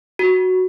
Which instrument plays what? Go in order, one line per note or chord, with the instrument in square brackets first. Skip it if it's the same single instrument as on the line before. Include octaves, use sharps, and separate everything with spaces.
[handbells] F#4